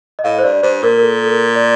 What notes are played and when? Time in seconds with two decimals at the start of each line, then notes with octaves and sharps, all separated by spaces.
0.19 D#5
0.24 A2 F5
0.39 C5
0.43 G2 D5
0.63 G2 C5
0.82 A#2 A#4
0.98 A#4
1.03 A4
1.24 A4
1.29 A#4
1.55 D5